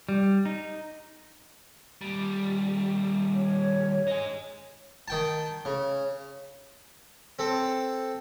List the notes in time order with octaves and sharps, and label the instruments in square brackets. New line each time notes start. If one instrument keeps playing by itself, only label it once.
[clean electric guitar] G3
D#4
[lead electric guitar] D#2 G3
[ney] C#5
[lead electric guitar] D#4 G#4
[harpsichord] D#3 G5 A5
C#3
C4 A4